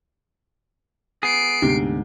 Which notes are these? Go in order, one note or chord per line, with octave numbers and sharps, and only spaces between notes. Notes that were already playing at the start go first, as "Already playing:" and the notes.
B3 G#4 C7 D7
D2 G#2 C3 B3 D4